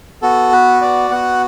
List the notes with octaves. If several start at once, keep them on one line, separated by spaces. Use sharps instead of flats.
B3 F#4 A4
B4
D5
B3 F#4 F#5